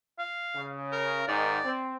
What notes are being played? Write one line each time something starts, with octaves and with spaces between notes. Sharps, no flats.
F5
C#3
A#4
G#2 D#3 D5
C4